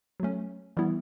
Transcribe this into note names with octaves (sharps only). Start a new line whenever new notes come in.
F#3 A3 C#4
E3 G3 B3 E4